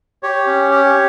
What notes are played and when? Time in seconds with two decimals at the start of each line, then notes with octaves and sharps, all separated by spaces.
0.23 G4 C#5
0.47 C#4
0.71 G4